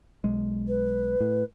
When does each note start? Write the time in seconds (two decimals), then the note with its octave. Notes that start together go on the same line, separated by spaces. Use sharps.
0.24 B1 G#3
0.68 B4
1.21 A2